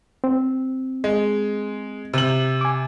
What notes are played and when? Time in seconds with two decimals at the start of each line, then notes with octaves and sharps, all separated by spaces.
0.24 C4
1.04 G#3
2.14 C3 F#7
2.61 G#5 D6